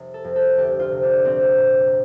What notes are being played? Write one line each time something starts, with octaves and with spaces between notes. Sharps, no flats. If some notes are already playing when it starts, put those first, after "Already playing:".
Already playing: F1
A4
F2
A4
D2 G4
F4
C3
D4
A#1 C4
A#2